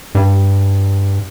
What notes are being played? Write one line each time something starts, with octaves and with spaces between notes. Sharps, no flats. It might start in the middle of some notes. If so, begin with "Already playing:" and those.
G2